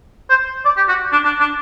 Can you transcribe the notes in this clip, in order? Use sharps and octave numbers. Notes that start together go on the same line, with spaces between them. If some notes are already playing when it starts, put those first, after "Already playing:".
C5
D5
G4
F#4
D4
D4
D4